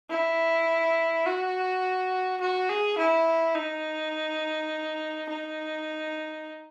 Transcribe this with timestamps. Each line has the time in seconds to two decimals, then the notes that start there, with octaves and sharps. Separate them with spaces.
0.10 E4
1.26 F#4
2.41 F#4
2.70 G#4
2.98 E4
3.55 D#4
5.28 D#4